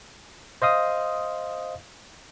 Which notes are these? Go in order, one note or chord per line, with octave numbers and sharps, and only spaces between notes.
C5 D#5 F5 D#6